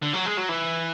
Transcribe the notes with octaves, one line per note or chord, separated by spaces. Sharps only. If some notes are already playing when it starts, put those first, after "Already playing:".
D3
F#3
G#3
F#3
E3